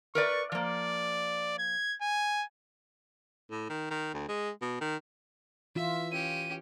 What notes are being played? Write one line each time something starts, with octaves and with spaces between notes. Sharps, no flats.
A#4 B4 D5 C#6
F3 A#3 D5
G#6
G#5
A2
D#3
D#3
D2
G#3
B2
D#3
E3 F4 E5
C#4 G4 D#7